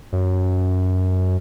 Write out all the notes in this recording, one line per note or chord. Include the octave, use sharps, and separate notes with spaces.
F#2